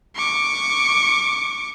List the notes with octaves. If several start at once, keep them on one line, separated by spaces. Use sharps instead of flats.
C#6 D6